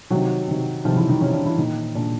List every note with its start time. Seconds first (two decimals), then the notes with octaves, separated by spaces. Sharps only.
0.11 C3 D#3 F#3 F#4
0.48 C3 D#3
0.85 C3 D#3 F3 F4
0.96 E3 E4
1.09 D#3 D#4
1.21 C3 D#3 C#4
1.33 D4
1.46 E3 E4
1.58 A#2 D#3 D#4
1.95 A#2 D4